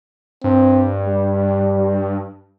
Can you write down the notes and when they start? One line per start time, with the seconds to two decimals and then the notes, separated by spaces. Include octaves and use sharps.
0.44 G2 C4
1.06 G3